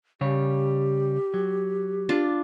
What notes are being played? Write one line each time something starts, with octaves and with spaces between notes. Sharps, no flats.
C#3 G3 G4 C#5
F#3
D4 F4